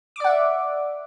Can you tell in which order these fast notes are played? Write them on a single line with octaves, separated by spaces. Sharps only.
D6 D5 F#5 E5